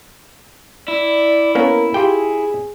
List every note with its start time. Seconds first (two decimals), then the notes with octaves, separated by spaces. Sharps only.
0.88 E4 D5
1.55 A#3 B3 C#4 A#4
1.94 F4 G4 G#4 G5